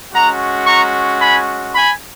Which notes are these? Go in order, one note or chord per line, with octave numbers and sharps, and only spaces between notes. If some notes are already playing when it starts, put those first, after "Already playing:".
G#3 C#4 F#4 F#5 A#5
A#5 C#6
G#5 B5
G#5 B5